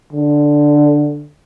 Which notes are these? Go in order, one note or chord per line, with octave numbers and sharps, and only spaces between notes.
D3